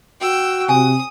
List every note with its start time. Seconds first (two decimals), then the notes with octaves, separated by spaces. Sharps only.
0.21 F#4 G5 E6
0.69 C3 G#5 D#6